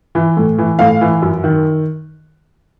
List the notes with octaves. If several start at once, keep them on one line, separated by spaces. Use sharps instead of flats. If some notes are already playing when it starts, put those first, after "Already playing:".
E3
A2
E3
A2 F5
E3
F#2
D#3